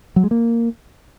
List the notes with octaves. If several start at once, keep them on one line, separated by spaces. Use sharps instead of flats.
F#3
G#3
A#3